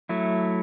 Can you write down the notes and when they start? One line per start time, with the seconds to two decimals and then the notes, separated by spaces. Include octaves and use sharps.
0.09 F#3 A3 E4